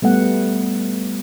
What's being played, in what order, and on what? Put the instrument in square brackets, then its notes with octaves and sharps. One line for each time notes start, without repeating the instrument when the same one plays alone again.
[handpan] G3 A3 B3 F#5